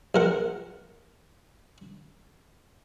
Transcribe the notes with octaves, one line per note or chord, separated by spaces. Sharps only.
A#1 A#4 F#5